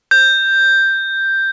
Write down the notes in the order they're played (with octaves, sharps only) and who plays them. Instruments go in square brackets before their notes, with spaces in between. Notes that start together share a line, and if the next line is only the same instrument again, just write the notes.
[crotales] G6